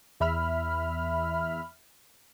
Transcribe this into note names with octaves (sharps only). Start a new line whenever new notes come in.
E2 E5 B5 F6